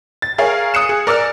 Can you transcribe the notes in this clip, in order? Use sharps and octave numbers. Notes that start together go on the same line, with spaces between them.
A6
G#4 A#4 C#5 F5
D#6 F#6 C#7 E7
G#4
A#4 D5 E6 F6